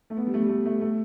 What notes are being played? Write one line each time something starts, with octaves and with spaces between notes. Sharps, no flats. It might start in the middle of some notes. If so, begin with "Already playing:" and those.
A3
B3
G3
A3
G3
A3
A3
A3